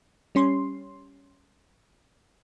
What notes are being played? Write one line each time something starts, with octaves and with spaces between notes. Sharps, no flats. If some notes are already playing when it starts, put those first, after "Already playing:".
G3 C#4 C6